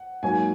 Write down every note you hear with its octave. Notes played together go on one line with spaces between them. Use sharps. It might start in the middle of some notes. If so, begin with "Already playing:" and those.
Already playing: F#5
G#2 F#3 A#3 G#5